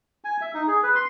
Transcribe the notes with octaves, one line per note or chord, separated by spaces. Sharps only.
G#5
E5
D#4
G#4
B4
C6